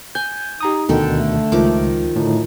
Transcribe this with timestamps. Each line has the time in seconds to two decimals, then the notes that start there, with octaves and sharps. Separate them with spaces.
0.15 G#5 G6
0.61 D#4 G4 A#5 D#6
0.89 D2 B2 D3 D#3 A4 G5
1.15 A3
1.52 C#2 D#3 F3 D6
2.16 A2 D3 D#4